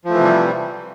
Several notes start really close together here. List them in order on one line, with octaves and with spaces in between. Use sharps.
F3 A3 E3 C3 G3